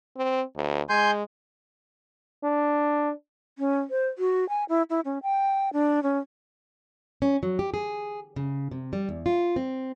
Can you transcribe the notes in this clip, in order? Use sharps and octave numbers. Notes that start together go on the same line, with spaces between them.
C4
D2
G#3 G#5 C6 G6
D4
C#4
C5
F#4
G#5
E4
E4
C#4
G5
D4
C#4
C#4
F#3
G4
G#4
C#3
C3
G3
E2
F4
C4